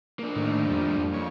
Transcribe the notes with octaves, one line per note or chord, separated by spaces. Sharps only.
A#3 D4
A2 D#3
F2 G3
F2 C#5